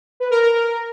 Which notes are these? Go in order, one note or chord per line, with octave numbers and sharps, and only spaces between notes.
B4
A#4
A#4
A#4